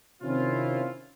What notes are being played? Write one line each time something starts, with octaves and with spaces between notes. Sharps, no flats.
C3 D#3 C4 C#4 E4 F4